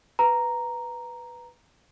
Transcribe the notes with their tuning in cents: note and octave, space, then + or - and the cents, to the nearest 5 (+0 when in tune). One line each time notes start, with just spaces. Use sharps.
B4 +0 A#5 +0